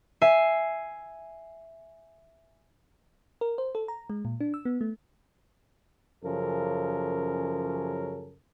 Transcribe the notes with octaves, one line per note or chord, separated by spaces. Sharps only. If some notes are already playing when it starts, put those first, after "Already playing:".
E5 G#5 C7
A#4
C5
A4
A#5
G#3
A#2
D4
E6
B3
A3
F#2 C#3 F3 C#4 A4 A#4